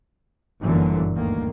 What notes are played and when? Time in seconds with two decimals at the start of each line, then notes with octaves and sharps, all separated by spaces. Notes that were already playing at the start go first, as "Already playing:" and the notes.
0.61 G1 F#2 A#2 D3 E3 F#3
1.14 D2 D#3 A#3